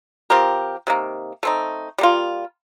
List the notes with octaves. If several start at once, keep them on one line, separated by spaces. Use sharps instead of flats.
F3 C4 G4 A#4
C3 D#3 A#3
A3 C4 D#4
G3 A#3 F4